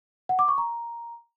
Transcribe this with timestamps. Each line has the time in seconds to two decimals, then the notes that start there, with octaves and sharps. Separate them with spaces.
0.29 F#5
0.39 D6
0.48 C#6
0.58 A#5